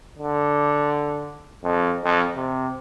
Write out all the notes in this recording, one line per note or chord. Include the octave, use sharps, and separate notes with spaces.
D3
F2
F2
C3